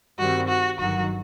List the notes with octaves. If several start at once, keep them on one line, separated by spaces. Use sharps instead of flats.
G2 D#3 G3 C4 F#4
F#4
G1 G2 D#3 F#3 F#4